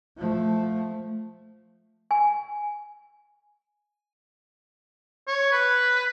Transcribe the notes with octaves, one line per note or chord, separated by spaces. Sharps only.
F3 A3
G#5
C#5
B4